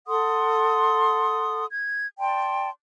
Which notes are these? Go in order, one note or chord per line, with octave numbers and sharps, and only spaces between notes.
A4 F#5 C6 D#6
G#6
D5 G5 A5 C6